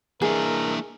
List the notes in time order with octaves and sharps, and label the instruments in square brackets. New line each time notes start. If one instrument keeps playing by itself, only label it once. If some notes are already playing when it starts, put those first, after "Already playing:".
[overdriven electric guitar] E3 D4 [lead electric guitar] A#3 E5 [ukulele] G#4 [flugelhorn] A#4